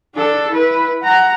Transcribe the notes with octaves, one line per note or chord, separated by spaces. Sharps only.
D4 A4
E4 B4
F#5 A#5